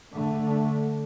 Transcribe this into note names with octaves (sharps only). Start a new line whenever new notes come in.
D3 A3